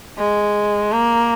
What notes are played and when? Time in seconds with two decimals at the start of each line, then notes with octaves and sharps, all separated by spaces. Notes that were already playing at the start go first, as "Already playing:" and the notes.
0.18 G#3
0.92 A#3